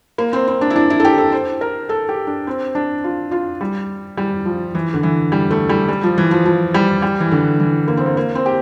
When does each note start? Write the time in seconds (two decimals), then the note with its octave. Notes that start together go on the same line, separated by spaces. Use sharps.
0.18 A#3
0.33 C4
0.47 C4
0.61 D4
0.70 E4
0.76 D4
0.90 E4
1.00 A4
1.05 G4
1.18 A4
1.32 C5
1.61 A#4
1.89 A4
2.09 G4
2.27 D4
2.47 C4
2.75 D4
3.04 F4
3.31 F4
3.61 G3
4.17 G3
4.45 F3
4.75 E3
4.94 D3
5.03 E3
5.32 G3
5.51 A3
5.69 G3
5.89 G3
6.03 F3
6.18 E3
6.31 F3
6.45 F3
6.74 G3
7.02 G3
7.20 E3
7.31 D3
7.60 E3
7.88 A#3
7.97 C4
8.06 A#3
8.17 A#3
8.35 C4
8.46 G4